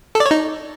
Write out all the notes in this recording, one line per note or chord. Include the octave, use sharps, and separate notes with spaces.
A4
D5
C#5
D#4